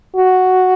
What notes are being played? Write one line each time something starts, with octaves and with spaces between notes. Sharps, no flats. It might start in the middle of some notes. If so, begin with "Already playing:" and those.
F#4